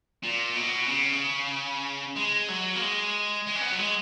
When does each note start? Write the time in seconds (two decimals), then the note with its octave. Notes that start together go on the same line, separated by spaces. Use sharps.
0.23 A#2
0.55 B2
0.87 C#3
2.16 G#3
2.48 F#3
2.76 A#3
2.82 G#3
3.47 G#3
3.55 C#4
3.62 B3
3.72 F#3
3.79 G#3